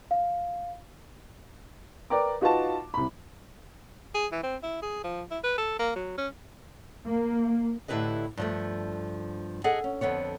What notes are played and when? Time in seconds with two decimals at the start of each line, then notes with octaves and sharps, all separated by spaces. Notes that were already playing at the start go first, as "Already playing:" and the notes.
0.11 F5
2.10 A#4 B4 D5 G5 A#5 D6
2.41 D#4 F4 F#4 B4 F5 A5
2.94 C2 B5
4.15 G#4
4.32 E3
4.43 C4
4.63 E4
4.82 G#4
5.04 F3
5.31 E4
5.44 B4
5.58 A4
5.79 A#3
5.96 F#3
6.18 C#4
7.05 A#3
7.88 A2 D3 E4 G4 B4 D#5
8.37 G2 F3 A3
9.64 G#4 A4 D#5 F#5
9.84 C#4
10.01 F2 D3 B3 C#5